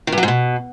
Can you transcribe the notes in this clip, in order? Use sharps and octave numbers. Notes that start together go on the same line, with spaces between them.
D#3
G2
F#3
G#2
B2